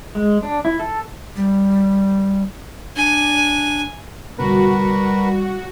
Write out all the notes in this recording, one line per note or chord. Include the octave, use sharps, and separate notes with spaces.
G#3
D4
E4
A4
G3
D4 G#5
F1 B2 D3 G3 F#4 A#4 B4